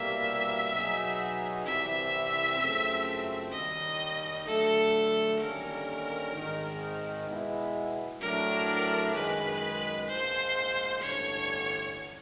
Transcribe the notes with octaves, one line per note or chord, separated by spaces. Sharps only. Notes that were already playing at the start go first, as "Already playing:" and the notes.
Already playing: C2 B2 G3 A#3 E5
B2 F#3 B3 D#4 G#4
C2 C3 E3 G3 C4 E5
F#2 C#3 F3 A3 C4
D#2 D#3 G3 D#5
D3 F#3 A3 A4
D#2 D3 G3 A#3 C#4 A#4
G#1 G#2 D#3
B2 G#3 B3 E4
A2 F#3 A3 D4 A#4
F#2 D#3 G#3 B4
A#1 G#2 F3 C5
A1 G2 D3 C#5